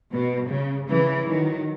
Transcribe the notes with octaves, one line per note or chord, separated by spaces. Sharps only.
B2
C#3
C#3 E3
D#3 F#3